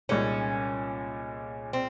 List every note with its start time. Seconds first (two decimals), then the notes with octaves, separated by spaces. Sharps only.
0.09 C2 A#2 G#3 C#4 D#4
1.73 C4